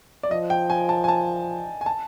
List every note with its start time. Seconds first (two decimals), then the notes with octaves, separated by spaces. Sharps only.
0.23 D5
0.31 F3 D#5
0.50 G5
0.70 G#5
0.89 A5
1.04 G#5
1.08 A5
1.81 G#5
1.86 A5